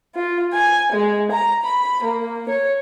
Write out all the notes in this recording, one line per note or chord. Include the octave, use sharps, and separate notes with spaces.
F4
G#5
G#3
A#5
B5
A#3
C#5